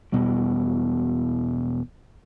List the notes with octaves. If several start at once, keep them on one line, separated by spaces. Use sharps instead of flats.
E1 B2 G3